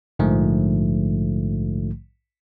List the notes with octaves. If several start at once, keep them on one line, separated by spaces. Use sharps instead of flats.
A#1 G#2 D3 F3 A3